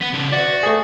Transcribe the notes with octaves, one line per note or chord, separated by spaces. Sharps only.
B3 B6
C#3 A4
F#4 D5
A3 G#4